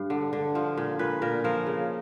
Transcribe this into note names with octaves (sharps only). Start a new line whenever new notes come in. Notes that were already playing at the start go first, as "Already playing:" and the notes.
Already playing: G2
D3
D3
F3
A#2
A#2 B4
A#2 A#4
F3 A#4
C#3